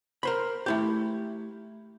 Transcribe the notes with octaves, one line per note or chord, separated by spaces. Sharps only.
A#4 C5 B5
A3 E4 G4